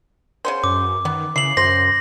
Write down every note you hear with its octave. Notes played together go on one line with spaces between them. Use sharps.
C#3 B3 C5
F#2 D6
D#3 B3
C#3 E4 C7 F#7
F#2 C5 A#6